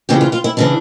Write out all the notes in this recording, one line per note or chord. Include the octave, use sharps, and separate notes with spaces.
F2 C#3 E3 G4
F4
F4
E4
C#3 E3 D4